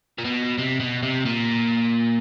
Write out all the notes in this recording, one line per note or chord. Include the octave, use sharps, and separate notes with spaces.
A#2
B2
C3
B2
C3
A#2